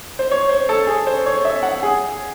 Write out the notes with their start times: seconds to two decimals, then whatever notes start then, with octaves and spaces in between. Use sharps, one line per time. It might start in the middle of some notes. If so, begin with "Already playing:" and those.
0.19 C5
0.31 C#5
0.49 C5
0.69 A4
0.87 G#4
1.07 C5
1.26 C#5
1.45 E5
1.63 F#5
1.83 G#4